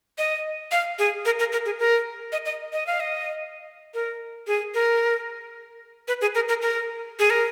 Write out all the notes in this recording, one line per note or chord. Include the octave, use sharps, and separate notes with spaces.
D#5
F5
G#4
A#4
A#4
A#4
G#4
A#4
D#5
D#5
D#5
F5
D#5
A#4
G#4
A#4
B4
G#4
A#4
A#4
A#4
G#4
A#4